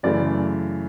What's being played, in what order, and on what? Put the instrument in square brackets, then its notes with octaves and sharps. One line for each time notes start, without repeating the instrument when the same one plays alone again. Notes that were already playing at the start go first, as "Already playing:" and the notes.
[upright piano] F#2 C#3 E3 A3 D5